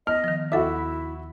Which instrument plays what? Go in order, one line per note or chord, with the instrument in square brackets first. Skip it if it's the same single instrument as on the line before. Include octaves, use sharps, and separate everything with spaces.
[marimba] B3 [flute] D#5 [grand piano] F6
[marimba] D#3 F3
[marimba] D#2 A4 D6 [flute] E4 [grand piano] F#4 E5